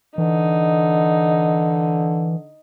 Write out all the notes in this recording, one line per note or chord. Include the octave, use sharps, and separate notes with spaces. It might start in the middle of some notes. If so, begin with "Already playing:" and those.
D3 E3 D#4